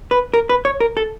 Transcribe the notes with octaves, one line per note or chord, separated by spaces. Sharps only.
B4
A#4
B4
C#5
A#4
A4